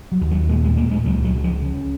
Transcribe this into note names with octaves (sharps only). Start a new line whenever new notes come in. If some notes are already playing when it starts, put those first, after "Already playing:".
F#3
D#2
F#3
A#2 G#3
G#3
A#2 A#3
G#3
C#2 F#3
F#3
C#3
F3
C#3